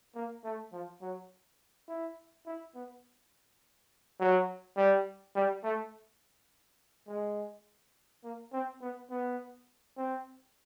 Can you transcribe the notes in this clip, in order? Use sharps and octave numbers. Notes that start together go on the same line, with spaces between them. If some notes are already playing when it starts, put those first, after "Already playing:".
A#3
A3
F3
F#3
E4
E4
B3
F#3
G3
G3
A3
G#3
A#3
C4
B3
B3
C4